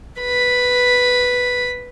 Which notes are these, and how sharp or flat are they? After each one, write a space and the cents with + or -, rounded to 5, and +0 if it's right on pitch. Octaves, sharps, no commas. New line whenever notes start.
B4 +0 B5 +0